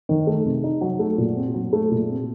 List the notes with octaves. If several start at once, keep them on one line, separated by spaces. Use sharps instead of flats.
D#3
A3
C3
D#4
F#3
A3
A#2
C4
F#3
A3
A#2
C4